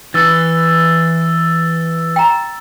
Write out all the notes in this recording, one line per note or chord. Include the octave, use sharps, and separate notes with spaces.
E3 E6 A6
G5 A#5